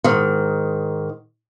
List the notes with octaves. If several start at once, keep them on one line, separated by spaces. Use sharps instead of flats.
G#2 D#3